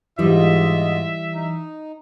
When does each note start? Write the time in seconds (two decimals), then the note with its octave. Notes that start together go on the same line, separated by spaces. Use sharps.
0.19 G#2 E3 G3 F4 D#5 E5
1.34 D#4